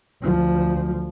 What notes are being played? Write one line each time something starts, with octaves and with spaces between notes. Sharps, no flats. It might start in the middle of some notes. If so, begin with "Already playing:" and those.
D2 F3